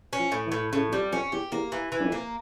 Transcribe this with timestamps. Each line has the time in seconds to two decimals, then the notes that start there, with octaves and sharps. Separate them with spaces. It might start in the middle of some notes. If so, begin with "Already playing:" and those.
0.13 C#4
0.19 F3
0.32 A2
0.46 E3
0.52 A2
0.72 A2 C#3
0.88 E2
0.92 F2 G3
1.12 F2 C#4
1.32 E2 G4
1.51 E2 A#3
1.72 E3
1.92 E3
1.99 G2
2.04 F2
2.12 A#3